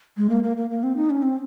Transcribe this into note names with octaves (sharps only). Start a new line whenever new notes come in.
G#3
A#3
A#3
A#3
A#3
C4
D#4
C#4
C4